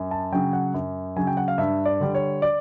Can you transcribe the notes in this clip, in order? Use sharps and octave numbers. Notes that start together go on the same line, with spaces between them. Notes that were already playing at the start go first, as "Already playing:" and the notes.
Already playing: F#2
A5
C#3 F#3 G5
F#5
F#2
C#3 F#3 G#5
G5
F#5
F5
G2 E5
D5
D3 G3
C#5
D5